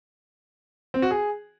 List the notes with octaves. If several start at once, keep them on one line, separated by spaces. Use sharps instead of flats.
C4
F#4
G#4